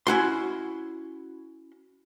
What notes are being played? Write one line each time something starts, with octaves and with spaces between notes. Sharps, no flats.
C#4 E4 F#4 C6